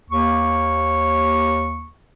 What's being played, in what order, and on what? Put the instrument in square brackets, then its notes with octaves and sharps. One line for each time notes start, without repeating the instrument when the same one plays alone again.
[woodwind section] D#2 A#3 C#6